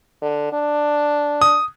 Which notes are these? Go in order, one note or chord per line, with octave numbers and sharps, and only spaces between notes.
D3
D4
D#6